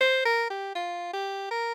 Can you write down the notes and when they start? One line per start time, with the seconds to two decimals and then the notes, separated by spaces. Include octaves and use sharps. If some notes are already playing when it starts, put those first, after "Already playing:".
0.01 C5
0.26 A#4
0.50 G4
0.75 F4
1.13 G4
1.51 A#4